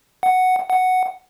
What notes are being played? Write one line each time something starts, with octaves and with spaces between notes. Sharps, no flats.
F#5
F#5